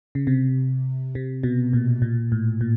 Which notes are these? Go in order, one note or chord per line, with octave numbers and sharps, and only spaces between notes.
C#3
C3
C3
B2
A#2
A#2
A2
A#2